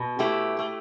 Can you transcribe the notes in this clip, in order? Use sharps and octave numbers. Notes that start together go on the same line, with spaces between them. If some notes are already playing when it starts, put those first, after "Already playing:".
Already playing: B2
A3 E4 G4
A3